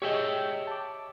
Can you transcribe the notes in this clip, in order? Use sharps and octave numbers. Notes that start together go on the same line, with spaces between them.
G4 G#4 C#5 D#5 E5 G5
A5 D6